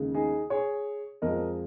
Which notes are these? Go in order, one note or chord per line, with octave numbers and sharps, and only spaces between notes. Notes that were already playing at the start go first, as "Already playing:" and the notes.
Already playing: D#2 C#3 G#3
D#4 G#4
G#4 C#5
F2 F3 G#3 A#4 D#5